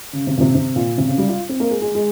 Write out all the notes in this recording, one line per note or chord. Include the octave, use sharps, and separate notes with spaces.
C#3
C3
A#2
C3
C3
A#2
C3
C#3
G3
F4
C4
A#3
G#3
G#3
G#3